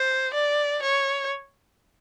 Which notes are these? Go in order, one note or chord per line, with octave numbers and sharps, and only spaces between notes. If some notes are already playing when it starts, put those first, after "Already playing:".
Already playing: C5
D5
C#5